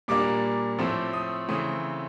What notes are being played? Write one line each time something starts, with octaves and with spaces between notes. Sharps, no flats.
A#2 G3 A#3 D4 D6
A2 F3 A3 C4
D#6
C#3 E3 A3 C4 D#6